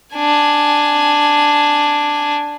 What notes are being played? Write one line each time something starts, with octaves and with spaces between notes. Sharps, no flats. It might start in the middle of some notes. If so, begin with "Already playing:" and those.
D4 G#5